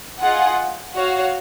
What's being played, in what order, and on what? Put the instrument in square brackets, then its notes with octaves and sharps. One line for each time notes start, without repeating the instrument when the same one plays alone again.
[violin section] F4 G#4 D#5 F#5
F#4 C#5 F5